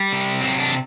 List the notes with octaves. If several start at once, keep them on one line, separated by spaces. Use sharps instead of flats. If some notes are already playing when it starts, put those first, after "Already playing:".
Already playing: G3
C3
F#3 C4
D4